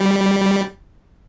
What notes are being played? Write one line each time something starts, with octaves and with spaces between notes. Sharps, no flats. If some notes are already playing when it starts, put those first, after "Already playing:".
Already playing: G3